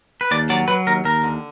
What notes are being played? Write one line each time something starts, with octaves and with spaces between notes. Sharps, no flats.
B4
D#2 D5
F#3 D5
F#3 B4
D#2 A#4
D#2 A#4
D3